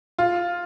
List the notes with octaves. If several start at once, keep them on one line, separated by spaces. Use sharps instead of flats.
F4